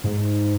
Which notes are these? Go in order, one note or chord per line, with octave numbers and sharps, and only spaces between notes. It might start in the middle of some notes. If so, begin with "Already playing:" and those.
G#2